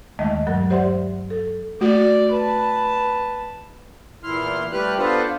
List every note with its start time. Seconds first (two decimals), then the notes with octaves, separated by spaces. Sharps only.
0.19 D#2 D#3 G#3 A3 D#5 E5
0.47 G2 F#3 A#4 F#6
0.70 G4 C5 D5 E5 F#5 C6
1.30 A4
1.81 A3 F#4 D5
2.32 B4 A5
4.24 E2 A#2 E4 C6 F6
4.72 G3 A3 G4 B4 F6 F#6
4.98 B3 D4 F4 A4 B4 C5